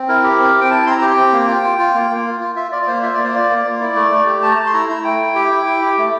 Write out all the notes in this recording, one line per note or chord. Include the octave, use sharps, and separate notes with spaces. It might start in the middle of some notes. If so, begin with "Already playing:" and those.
Already playing: C4
E4 A#4
G4
C4
C4
G5
E4 A5
C4 C6
A#5
G4
C4 G5
A#3
F4
F4
F4
A#3
A#3
F4
F4
F4 E5
F4 D5
D5
A#3 C5
F4 E5
D5
A#3
C5
F4 D5
A#3
A#3
E4 D5
A3
A3
G4
A3 A5
A#5
A3 A5
C6
E4 A#5
E4 A#5
A3 G5
E4
G4
E4
E4
G4
A3